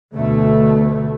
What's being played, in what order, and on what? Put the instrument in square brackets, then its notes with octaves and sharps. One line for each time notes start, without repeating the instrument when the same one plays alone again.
[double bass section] D2 B2 A3